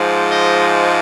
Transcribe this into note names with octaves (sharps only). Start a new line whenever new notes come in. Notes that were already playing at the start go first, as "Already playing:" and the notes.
Already playing: G#2 F3 G#3
D#5